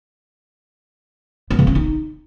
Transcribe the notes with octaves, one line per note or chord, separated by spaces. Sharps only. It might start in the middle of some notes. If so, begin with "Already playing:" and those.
B3
C#3
C4
D#4